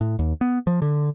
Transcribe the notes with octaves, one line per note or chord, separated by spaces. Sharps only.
A2
D#2
B3
F3
D3